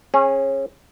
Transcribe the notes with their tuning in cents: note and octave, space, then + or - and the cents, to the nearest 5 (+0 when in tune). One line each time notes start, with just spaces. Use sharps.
C#4 -25 G#4 +0